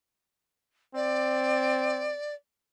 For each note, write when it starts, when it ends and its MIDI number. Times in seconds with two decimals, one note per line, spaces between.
0.95 2.15 60
0.95 2.34 74